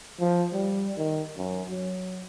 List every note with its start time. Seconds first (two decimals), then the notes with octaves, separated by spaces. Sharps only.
0.20 F3
0.53 G3
0.98 D#3
1.37 F#2
1.70 F#3